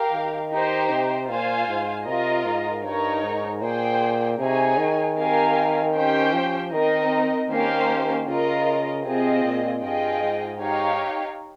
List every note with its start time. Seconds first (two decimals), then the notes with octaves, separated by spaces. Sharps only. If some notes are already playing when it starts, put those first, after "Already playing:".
Already playing: G4 A#4 F5
0.13 D#3
0.51 D#4 G4 C5
0.90 C3
1.29 A#2 F4 C5 F5 G#5
1.68 G#2
2.06 C3 F4 A#4 D#5
2.45 G#2
2.84 G2 D#4 A#4 C#5
3.23 G#2
3.62 A#2 G#4 C5 G5
4.39 C3 D#4 G#4 C#5 G#5
4.78 D#3
5.17 C4 G4 A#4 F5 G#5
5.95 C#4 G4 C5 G5
6.33 F3
6.72 D#3 C4 D#4 A#4 D#5
7.50 D#3 A#3 C#4 G4 C5 F5
8.27 C#3 F4 A#4 D#5
9.05 C3 C4 F4 G#4 D#5
9.44 A#2
9.82 G2 F4 G#4 D#5 G5
10.22 G#2
10.60 D#4 G4 C#5 F5